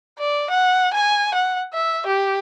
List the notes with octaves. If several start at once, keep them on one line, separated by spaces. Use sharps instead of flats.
D5
F#5
G#5
F#5
E5
G4